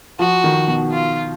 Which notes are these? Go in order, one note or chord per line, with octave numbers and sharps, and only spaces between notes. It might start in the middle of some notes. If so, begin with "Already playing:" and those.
F3 F#4
D#3
B2
F4